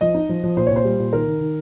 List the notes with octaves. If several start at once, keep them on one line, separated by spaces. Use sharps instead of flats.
F3 D#5
D#4
F3
F3
A#2 C5
C#5
A#2 C5
G3
A#2
D#3 A#4
D#3
D#3